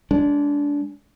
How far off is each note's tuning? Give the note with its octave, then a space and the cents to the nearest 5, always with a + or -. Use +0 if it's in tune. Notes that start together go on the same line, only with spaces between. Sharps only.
G#3 +0 D4 -20